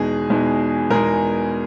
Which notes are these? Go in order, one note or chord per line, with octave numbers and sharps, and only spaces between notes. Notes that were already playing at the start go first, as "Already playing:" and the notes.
Already playing: E2 B2 G#3 D#4 G#4
E2 B2 G#3 D#4
E2 B2 G#3 D#4 A#4